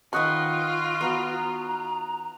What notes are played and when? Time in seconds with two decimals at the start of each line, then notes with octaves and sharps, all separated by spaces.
0.13 D#3 F4 B4 D#5 F#5 G#5 C#6
1.01 B3 F#4 A#5